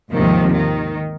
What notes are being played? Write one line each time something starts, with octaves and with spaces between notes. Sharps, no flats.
D#2 G#2 C3 D#3 F3
D#3